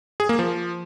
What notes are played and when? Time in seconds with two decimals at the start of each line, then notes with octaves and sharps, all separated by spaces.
0.20 G#4
0.29 A#3
0.39 F3